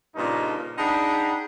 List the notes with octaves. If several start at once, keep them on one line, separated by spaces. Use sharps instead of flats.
G2 A#2 C#3 F3 D4 D#4
D4 D#4 G#4 F#5 G5 B5